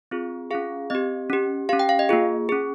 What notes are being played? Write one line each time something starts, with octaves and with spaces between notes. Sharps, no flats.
C4 F4 G#4
C#4 F4 G#4 F5
C4 G4 D#5
C#4 G4
C#4 G4 F5
G5
F5
D#5
A#3 F4 G#4
C#4 G#4